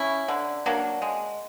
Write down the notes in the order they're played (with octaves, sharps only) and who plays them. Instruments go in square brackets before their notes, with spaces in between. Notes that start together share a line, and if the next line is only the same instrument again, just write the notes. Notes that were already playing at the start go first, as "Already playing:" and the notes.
Already playing: [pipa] C#4 E4
D3
F#3 A#3 D4
G#3